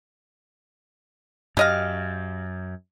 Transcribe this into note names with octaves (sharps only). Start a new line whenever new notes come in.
F#2 G4 D#5 F5